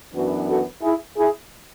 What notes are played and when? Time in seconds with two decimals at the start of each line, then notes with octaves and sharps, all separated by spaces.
0.14 F#2 E3 B3 D4 F#4
0.48 F#4 A4
0.82 E4 G#4
1.17 E4 G#4